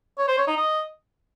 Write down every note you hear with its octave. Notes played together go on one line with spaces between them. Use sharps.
C#5
C5
C#5
D#4
D#5